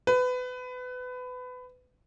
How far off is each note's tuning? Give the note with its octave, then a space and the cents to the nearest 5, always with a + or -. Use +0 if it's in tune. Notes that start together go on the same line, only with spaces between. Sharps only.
B4 +25